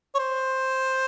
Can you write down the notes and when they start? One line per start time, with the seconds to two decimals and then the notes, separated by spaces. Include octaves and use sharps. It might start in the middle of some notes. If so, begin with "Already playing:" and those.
0.15 C#5
0.18 C5